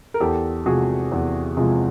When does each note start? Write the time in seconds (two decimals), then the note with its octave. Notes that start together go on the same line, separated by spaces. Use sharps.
0.14 A#4
0.20 E2 G4 A4
0.65 C3 F3 G#3 F#4 G#4
1.12 E2
1.57 C3 F3 G#3